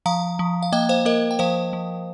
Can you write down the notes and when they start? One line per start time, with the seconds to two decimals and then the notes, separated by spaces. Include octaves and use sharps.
0.06 F3 F5 A#5
0.39 F3
0.63 F5
0.72 A#3 D#5 G5
0.89 C5 F5
1.05 A#3 A#4 D#5
1.31 G5
1.39 F3 C5 F5
1.73 F3